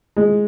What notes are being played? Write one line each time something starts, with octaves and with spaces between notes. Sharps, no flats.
G#3